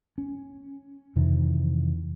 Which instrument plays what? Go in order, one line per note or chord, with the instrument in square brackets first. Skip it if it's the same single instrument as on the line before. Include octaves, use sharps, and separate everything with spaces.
[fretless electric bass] C#4
F2 C3 D#3 E3